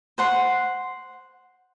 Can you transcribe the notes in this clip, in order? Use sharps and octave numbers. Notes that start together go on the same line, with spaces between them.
C5 F#5 C6